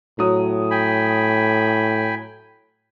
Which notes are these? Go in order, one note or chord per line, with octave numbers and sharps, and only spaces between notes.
A2 F#3 D#6
G5 G#5 B5